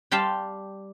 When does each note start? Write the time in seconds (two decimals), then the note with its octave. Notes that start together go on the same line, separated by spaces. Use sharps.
0.11 G3 G4 F5 A5 C6